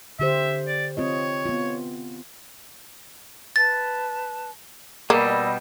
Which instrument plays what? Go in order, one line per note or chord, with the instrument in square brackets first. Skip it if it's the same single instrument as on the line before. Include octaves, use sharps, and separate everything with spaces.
[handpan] D3 G4 C5 [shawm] E5
[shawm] D5
[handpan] C4 F4 D#5 [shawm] C#5
[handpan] B3 F4
[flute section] B4 A5 [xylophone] A6
[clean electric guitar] B2 G3 [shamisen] A#3 [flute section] D5 D#5 E6